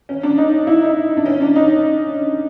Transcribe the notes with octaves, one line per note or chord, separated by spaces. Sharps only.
C#4
D4
D#4
E4
D#4
D4
C#4
D4
D#4